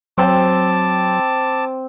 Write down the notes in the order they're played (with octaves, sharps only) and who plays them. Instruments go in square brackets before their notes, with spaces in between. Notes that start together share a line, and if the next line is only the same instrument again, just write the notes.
[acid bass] F#3 [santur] C4 [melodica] A5 D6